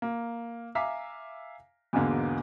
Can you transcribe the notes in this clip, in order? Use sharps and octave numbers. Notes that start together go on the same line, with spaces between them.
A#3
E5 F5 G#5 A#5 D6 B6
E2 G#2 B2 D3 A#3